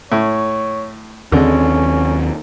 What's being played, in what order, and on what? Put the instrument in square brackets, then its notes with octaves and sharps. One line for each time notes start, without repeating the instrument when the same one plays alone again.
[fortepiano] A2 [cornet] C#5
[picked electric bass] D#2 C4 [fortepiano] D3 G#3 [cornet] C#4